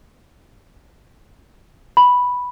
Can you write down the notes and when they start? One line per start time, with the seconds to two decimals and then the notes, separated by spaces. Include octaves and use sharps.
1.97 B5